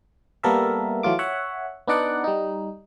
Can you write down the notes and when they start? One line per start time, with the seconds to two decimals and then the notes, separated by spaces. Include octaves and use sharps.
0.43 G3 A#3 B3 A4 A#4 E5
1.03 E3 F#3 A3 F4 D6
1.19 C#5 E5 F#5
1.87 B3 D4 D#4 D5 F#5
2.24 G3 D#4